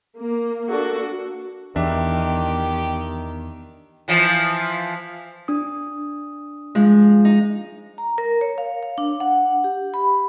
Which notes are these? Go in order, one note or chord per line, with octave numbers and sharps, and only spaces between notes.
A#3
A#3 D4 F#4 A4
E2 D#3 D4 G4 E5
E3 F3
D4 D#6
F3 G#3
D#4
A#5
A#4
C#5
F5
F5
D4
F#5
G4
B5